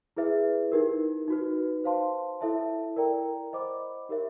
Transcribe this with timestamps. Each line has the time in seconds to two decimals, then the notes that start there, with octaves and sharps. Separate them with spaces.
0.17 E4 G#4 B4 E5
0.72 D#4 G4 A#4
1.28 D#4 F#4 B4
1.84 C5 F5 A5 C6
2.41 E4 A4 C#5 E5 A5
2.96 A#4 D5 G5 A#5
3.53 C5 D#5 F#5 B5 D6
4.09 D#4 G4 A#4 C#5 E5